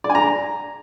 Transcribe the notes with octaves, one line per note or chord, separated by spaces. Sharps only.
D5
G#5
A#5